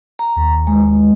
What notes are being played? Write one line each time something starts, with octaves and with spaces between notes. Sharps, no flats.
A#5
D#2
G#3